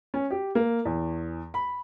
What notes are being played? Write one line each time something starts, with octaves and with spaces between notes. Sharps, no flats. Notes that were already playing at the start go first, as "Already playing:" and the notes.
C#4
G4
A#3
E2
B5